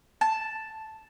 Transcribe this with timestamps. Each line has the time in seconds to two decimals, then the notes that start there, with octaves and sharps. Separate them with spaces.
0.21 A5